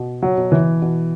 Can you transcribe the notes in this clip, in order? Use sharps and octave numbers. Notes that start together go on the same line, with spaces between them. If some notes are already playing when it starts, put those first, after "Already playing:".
Already playing: B2
F#3
B2
E3
B2